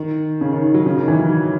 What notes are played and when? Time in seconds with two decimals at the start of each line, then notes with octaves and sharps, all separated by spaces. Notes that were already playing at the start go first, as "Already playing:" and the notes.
Already playing: D#3
0.41 C#3
0.52 D#3
0.64 D#3
0.74 F#3
0.86 C#3
0.97 D#3
1.08 E3
1.19 F#3